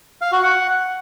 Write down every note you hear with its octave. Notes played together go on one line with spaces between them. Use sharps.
F5
F#4
F#5